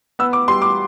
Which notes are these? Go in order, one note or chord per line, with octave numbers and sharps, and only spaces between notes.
B3 E6
D6
G3 C6
D6